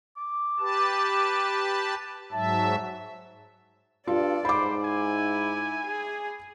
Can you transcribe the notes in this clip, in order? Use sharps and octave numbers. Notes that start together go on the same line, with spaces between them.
D6
G4 B4 A5
G#2 F#3 E5 A5
G2 F4 A4 D5
G#2 C5 B5 D6
E4 G#5
G#4